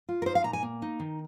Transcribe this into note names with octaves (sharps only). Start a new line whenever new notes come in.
F4
A#4
D#4 C5
F5
A#2 A#5
G#5
A#3
D#4
D#3